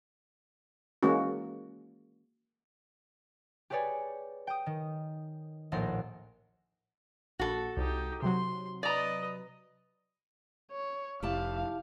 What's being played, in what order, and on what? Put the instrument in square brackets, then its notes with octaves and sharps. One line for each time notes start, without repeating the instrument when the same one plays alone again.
[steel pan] E3 G#3 A#3 C#4 F#4
[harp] G4 G#4 B4 C#5 D5 G#5
G5 D#6
D#3
A#1 D#2 A2 F#5 A#5 C6
[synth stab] A#1 [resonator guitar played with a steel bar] F#4 A4
[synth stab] C2 [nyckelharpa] D#4 G4
[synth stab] C3 F#3 [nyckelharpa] C6
[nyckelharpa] B4 D#5 [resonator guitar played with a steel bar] D5 A#5
[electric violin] C#5
[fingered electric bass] F1 [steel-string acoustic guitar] E4 G4 A5 [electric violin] F5